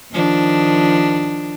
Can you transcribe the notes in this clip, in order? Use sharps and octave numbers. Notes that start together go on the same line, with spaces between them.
D#3 F3 D4